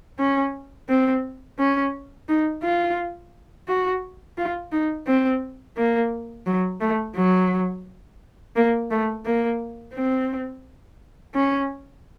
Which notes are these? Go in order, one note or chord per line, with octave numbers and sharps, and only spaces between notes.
C#4
C4
C#4
D#4
F4
F#4
F4
D#4
C4
A#3
F#3
A3
F#3
A#3
A3
A#3
C4
C#4